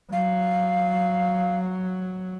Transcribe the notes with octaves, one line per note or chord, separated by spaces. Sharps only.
F#3 F5